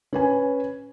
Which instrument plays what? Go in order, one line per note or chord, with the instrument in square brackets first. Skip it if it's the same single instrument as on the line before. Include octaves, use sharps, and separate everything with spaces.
[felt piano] C#4 B4 G#5